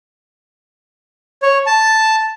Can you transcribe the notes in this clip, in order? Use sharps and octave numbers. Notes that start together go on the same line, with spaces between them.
C#5
A5